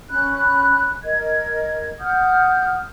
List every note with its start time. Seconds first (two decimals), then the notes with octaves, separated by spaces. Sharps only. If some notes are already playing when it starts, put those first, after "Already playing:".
0.10 C#4 B5 F#6
1.03 A#4 D#5 G#6
2.00 F#5 D#6 F6 G6